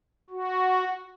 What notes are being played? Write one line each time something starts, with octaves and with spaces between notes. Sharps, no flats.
F#4